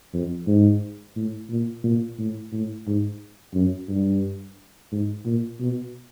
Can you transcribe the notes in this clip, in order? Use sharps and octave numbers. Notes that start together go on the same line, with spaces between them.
F2
G#2
A2
A#2
A#2
A2
A2
G#2
F#2
G2
G#2
A#2
B2